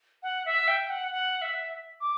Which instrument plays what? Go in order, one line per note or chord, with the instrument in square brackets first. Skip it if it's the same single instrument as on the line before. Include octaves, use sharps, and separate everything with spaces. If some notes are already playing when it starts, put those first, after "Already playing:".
[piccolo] F#5
E5
G5
F#5
F#5
E5
D6